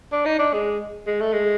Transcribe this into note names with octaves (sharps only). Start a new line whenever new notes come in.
D4
D#4
D4
G#3
G#3
A3
G#3